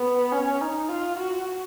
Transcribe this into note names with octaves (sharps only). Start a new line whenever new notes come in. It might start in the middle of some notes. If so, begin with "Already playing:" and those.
Already playing: B3
C#4
D#4
F4
F#4